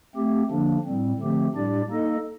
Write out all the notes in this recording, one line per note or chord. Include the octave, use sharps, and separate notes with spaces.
A3 C4 G4
D3 F3 A#3 D4
A2 G3 C4
D3 F3 A3 C4 G4
A2 G3 D4 G4 D5
A#3 D#4 A4 D#5